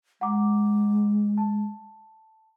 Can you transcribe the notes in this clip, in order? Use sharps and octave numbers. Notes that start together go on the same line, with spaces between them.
G#3 F#5 A#5 D6
A5